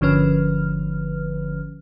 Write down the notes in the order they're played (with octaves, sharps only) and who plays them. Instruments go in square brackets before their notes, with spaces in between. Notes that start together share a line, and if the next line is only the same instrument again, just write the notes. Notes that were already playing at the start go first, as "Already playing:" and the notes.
[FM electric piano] G1 D3 F3 C#4 B4 F6